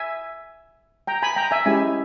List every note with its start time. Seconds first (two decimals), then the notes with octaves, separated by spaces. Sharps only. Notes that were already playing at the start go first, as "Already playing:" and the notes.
Already playing: E5 G#5
1.07 G5 A#5
1.22 G#5 B5
1.36 G5 A#5
1.51 E5 G#5
1.66 G#3 C#4 E4 G4 E5 G#5